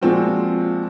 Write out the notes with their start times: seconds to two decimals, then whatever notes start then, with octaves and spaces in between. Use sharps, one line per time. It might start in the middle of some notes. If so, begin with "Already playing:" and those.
0.02 A#2 F3 G#3 C4 F4 F#4